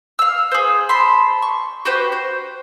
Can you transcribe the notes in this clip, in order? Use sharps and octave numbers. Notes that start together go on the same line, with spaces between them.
F5 E6
G#4 C5
A5 B5 C6
C#6
F#4 G4 B4 C5
C5